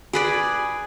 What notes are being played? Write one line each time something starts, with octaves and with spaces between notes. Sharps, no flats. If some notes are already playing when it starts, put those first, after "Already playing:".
G#4 B4 D5